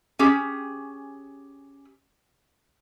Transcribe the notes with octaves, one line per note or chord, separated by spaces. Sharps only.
C#4 G4 G#4